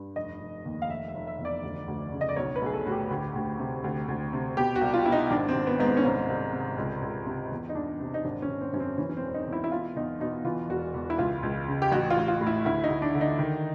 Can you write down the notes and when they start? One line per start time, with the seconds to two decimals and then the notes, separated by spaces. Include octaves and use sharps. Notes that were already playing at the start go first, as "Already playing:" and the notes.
Already playing: G2
0.16 F1 D#5
0.41 F1
0.65 D#2
0.82 F5
0.89 F1 E5
1.08 E5
1.14 F1
1.27 E5
1.39 E2
1.45 D5
1.63 D2
1.88 D2
2.12 C#3
2.21 D#5
2.29 D5
2.36 B1 C#5
2.56 B4
2.62 B1 G#4
2.73 A4
2.85 A2 F#4
2.92 G4
3.10 D2
3.35 D2
3.59 C3
3.84 D2
4.08 D2
4.33 C3
4.57 B2 G4
4.76 F#4
4.81 C2
4.94 F4
5.06 B2 E4
5.12 D#4
5.31 G#1 D4
5.48 C4
5.55 G#1
5.67 B3
5.79 G#2 B3
5.86 C4
5.97 C#4
6.04 C2 C4
6.28 C2
6.53 C3
6.78 C#2
7.02 C#2
7.26 C3
7.52 E2
7.69 D#4
7.75 E2 D4
8.01 C3
8.14 D#4
8.25 G#1 D4
8.42 C#4
8.49 G#1
8.61 C4
8.73 F#2 C#4
8.80 C4
8.98 E3 C#4
9.09 C#4
9.17 C4
9.23 E1
9.34 D#4
9.47 E2
9.53 E4
9.64 E4
9.71 B2 F4
9.96 E2 D#4
10.20 B2 D#4
10.44 E3 F4
10.69 E1 F#4
10.94 E2
11.10 E4
11.18 C#2 F4
11.43 C#2
11.68 C#3
11.82 G4
11.91 A1 F#4
12.10 F4
12.17 A1
12.28 F4
12.41 A2
12.47 E4
12.65 D2 E4
12.84 D#4
12.90 D2
13.02 D4
13.14 D3
13.21 D#4
13.39 D#3